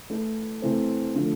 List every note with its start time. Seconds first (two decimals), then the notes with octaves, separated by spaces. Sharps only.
0.10 E3 A3 E4
0.62 C3 E3 A3 C4
1.15 D3 F3 A3